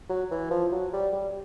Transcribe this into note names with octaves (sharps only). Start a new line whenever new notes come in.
F#3
E3
F3
F#3
G3
G3